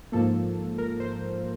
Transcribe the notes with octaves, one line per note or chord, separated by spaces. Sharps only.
G#2 F3 A#3 A4
A#4
C5